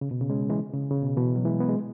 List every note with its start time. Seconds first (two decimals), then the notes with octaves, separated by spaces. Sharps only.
0.01 C#3
0.11 B2
0.21 C#3
0.30 G#3 C#4
0.49 E3 G#3
0.73 C#3
0.91 C#3
1.02 B2
1.17 B2 E3
1.36 F#3
1.45 E3 G#3
1.60 B3
1.69 G#3